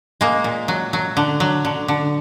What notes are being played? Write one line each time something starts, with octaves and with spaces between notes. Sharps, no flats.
G#3 A#3
A#2
F#3
F#3
D3
F#3
D3
D3